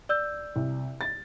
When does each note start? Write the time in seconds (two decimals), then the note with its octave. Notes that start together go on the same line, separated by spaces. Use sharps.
0.09 D5 E6 G6
0.56 C2
1.01 A6